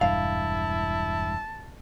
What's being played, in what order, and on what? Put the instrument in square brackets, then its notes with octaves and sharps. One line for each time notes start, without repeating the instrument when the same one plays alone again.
[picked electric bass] E1 G2 [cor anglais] E4 [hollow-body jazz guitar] F5 [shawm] A5